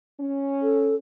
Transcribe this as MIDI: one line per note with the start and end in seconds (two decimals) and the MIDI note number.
0.20 0.99 61
0.62 0.95 69